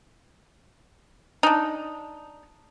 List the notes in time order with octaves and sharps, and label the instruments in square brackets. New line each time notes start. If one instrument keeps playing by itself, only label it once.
[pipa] D4 D#4